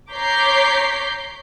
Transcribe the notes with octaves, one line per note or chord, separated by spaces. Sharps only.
C#5 A#5 D6 G6 B6 C7